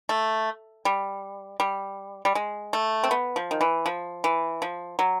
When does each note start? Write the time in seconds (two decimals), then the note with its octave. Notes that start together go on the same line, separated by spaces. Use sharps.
0.09 A3
0.85 G3
1.60 G3
2.25 G3
2.35 G#3
2.73 A3
3.04 C4
3.11 B3
3.36 F3
3.51 D#3
3.61 E3
3.86 F3
4.24 E3
4.62 F3
4.99 F#3